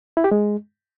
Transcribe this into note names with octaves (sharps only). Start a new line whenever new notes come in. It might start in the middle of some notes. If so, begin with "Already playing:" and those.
E4
G4
G#3